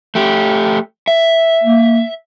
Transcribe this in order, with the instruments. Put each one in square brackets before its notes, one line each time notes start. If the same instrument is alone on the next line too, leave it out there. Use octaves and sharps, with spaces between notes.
[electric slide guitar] A3 G4
E5
[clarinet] A#3